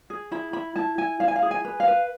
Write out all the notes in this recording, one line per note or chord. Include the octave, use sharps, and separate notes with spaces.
G#4
E4 B5
E4 B5
E4 A5
E4 G#5
E4 F5
G#5
F5
G#4
G#5
B4
F5
B4